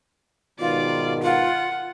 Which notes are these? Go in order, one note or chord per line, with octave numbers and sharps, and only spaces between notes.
G#2 B2 D#3 F4 D5
F4 F#5